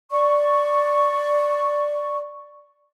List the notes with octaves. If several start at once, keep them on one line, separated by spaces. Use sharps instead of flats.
D5 C#6